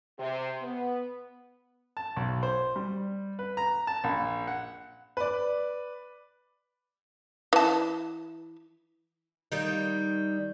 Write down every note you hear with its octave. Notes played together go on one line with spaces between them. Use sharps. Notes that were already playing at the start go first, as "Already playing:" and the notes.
C3
B3
A5
B1
C5
G3
B4
A#5
A5
A#1
F#5
B4 D5
E3 A5
D#3 G3 D#4